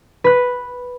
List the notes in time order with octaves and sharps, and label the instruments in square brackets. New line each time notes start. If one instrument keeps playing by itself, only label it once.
[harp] B4 F#6